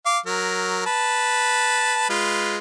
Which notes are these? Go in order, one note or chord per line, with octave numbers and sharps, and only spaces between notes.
F5 D6
F#3 A#4
B4 A5
G#3 F4 B4